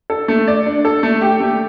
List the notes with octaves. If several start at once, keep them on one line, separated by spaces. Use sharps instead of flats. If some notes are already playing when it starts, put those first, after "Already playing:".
A4
A3
D5
D4
A4
A3
G4
A3